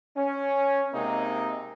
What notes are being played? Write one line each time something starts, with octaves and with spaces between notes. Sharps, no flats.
C#4
C3 G#3 A#3 D#4